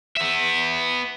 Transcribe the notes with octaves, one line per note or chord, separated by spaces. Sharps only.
B3 E5